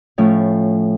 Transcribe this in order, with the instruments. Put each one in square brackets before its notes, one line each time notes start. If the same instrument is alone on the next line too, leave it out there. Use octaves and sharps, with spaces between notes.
[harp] A2 F3 C#4 G#5